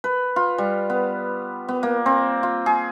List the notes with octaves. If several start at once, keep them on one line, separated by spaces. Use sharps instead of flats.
B4
F4
G3
B3
B3
A#3
C4
F4
G#4